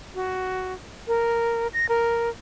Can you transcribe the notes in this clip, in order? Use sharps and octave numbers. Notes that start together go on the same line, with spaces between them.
F#4
A#4
A#6
A#4